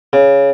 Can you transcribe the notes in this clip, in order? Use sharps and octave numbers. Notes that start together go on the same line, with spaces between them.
C#3